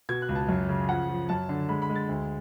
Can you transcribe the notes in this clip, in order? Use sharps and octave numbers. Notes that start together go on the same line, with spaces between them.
B2 G#6
F#6
C#2
A5
F#2
C#3
F3 F#5
F3
F#2 A5
D3
G#3 B5
B5
G#3
A6
D2